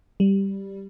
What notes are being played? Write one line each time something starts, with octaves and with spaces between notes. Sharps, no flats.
G3